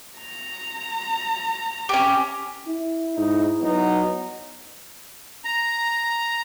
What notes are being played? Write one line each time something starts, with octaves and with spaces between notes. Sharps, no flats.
A#5
C#4 G4
E4
G#2 D#4
F#3 B3 D#4
A#5